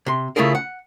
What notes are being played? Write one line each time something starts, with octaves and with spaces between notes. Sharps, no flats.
C3 C6
C#3 A3 E4 F4 G#4 A#4
F#5